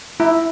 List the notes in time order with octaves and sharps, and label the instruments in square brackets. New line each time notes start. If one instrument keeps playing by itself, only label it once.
[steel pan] E4